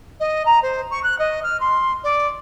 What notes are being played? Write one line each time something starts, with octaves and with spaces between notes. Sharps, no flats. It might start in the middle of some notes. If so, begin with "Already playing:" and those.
D#5
A#5
C5
C#6
F#6
D#5
F6
C6
D5